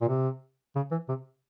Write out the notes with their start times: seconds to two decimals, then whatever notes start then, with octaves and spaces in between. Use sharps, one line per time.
0.01 A#2
0.08 C3
0.75 C#3
0.91 E3
1.08 C3